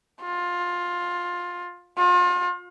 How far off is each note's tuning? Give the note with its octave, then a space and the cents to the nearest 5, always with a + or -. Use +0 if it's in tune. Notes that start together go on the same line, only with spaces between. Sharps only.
F4 +15
F4 +35